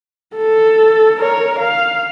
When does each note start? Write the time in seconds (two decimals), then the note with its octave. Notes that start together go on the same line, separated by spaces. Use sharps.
0.36 A4
1.20 A#4 C#5
1.59 F5